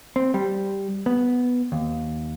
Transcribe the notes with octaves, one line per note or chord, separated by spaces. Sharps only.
C4
G3
B3
D#2